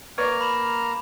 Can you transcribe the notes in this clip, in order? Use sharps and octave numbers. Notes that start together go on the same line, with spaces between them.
A#3 B4 C#5 D5 A#5 F6
B5 E7 F#7